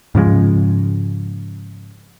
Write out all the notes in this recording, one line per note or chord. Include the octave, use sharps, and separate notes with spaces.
G#2 C#3 F3 G#3